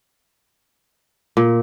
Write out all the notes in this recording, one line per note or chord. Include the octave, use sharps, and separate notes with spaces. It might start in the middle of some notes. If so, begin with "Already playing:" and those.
A#2